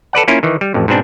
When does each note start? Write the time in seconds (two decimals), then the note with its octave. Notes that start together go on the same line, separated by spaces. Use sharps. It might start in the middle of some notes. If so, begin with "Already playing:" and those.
0.13 A4 B4 D5 F#5
0.28 A#3 C#4 E4 F4
0.43 D#3 E3
0.61 G3
0.74 A1 F2
0.88 G#2 B2 C4 D4